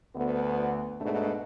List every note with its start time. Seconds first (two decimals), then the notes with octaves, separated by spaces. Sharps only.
0.15 D2 B3
1.01 G#2 B2 A3 D4